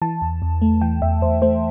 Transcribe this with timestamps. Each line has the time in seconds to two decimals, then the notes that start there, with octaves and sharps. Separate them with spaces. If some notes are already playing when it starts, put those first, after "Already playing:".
0.02 E3 A5
0.22 E2
0.42 E2
0.62 A3
0.81 E3 G5
1.02 E2 E5
1.22 E2 C5
1.42 A3 C5